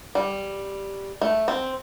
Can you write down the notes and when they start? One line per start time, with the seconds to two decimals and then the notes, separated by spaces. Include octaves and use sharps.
0.15 G3
1.21 A3
1.48 C4